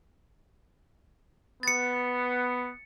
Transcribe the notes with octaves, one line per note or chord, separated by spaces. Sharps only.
B3 A6 C#7